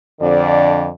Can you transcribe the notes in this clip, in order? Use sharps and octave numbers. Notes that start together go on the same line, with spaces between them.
F2 D3 D5